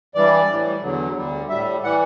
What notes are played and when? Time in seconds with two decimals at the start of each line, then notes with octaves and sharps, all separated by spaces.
0.15 G2 E3 G3 D5
0.49 A2 E3 G3
0.82 E2 D3 F#3
1.15 D2 D3 G3
1.49 A2 G3 E5
1.84 E3 G3 F#5